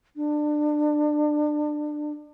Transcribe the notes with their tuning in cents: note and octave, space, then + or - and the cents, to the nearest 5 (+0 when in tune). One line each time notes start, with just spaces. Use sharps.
D4 +25